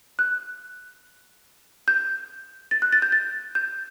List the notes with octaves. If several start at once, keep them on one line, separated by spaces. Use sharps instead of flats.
F#6
G6
A6
F#6
A6
G6
A6
G6